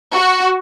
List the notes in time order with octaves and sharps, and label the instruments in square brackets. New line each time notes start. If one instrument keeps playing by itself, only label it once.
[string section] F#4